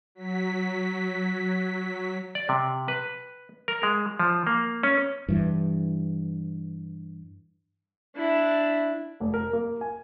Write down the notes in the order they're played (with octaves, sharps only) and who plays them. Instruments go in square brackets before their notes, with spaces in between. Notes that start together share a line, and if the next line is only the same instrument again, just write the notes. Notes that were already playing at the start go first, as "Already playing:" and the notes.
[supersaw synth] F#3 B6
[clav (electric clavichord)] D5
C3
B4
A#4
G#3
F3
A#3
C#4
[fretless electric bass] G2 E3
[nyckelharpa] D4 E4
[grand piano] F1
A#4
A#3
G#5